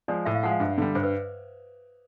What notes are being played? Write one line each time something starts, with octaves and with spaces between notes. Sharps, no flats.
F3 G#3 D5
A2 E5
F5
F3 G#3 F#5
F5
G2 E5
D3 G3
G2 C5
B4